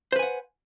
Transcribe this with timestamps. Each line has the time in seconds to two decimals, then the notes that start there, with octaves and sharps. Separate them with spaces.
0.12 C5
0.16 B4
0.19 G#5
0.23 F#5